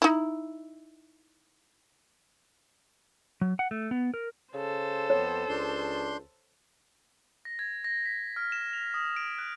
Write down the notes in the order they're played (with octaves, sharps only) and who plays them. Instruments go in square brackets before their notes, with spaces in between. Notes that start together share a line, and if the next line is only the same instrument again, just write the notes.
[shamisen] D#4 E4
[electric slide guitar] F#3
F#5
A3
B3
A#4
[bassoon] C#3 [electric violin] A4 C5
[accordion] F2 B3 [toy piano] C#5
[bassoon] C#2 [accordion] D4 C6 G6
[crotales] A#6
G#6
A#6
B6
F6
E7
F7
D#6
D7
F#6